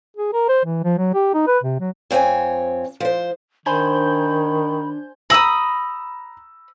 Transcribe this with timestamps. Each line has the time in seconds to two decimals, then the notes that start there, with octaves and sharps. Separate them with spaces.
0.17 G#4
0.33 A#4
0.49 C5
0.65 E3
0.84 F3
0.98 F#3
1.14 G4
1.34 D#4
1.48 B4
1.64 C3
1.80 F#3
2.11 F2 C4 F#4 C#5 G#5
3.00 F3 C5
3.66 D#3 D4 C5 G#5 B5 G6
5.30 A#5 B5 D#6 E6 A#6